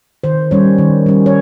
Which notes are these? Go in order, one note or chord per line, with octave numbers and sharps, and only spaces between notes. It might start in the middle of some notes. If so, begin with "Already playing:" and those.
D#3 C5
G3 C#4 C#5
D#3
G3 C#4
C#5